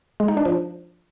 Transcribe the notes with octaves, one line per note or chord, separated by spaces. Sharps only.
G#3
D#4
D4
F3